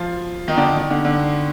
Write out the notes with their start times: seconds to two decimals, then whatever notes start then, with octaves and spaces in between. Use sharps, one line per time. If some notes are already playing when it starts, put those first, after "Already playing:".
Already playing: F3 F4
0.48 D#3 D#4
0.57 D3 D4
0.76 D#3
0.90 D3
1.05 D3